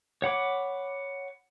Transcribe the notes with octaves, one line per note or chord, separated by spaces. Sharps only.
C#5 F#5 B5 D6